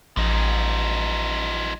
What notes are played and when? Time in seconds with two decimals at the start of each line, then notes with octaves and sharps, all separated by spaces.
0.17 A1 F3 D#4